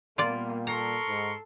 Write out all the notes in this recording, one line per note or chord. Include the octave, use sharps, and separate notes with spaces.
A#2 G3 A#3 B3 F4 D5
A4 A#4 A#5 C6 C#6
G#2